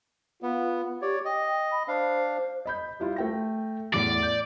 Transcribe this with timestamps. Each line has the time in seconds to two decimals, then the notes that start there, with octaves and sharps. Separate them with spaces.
0.43 B3 F4
1.02 G4 C#5 D5
1.25 D#5 G5
1.72 B5
1.88 D4 C5 F5
2.66 D#5 B5 G6
3.00 G3 E4 F4
3.16 A3 G5 A#6
3.94 E2 A2 D5
4.23 G6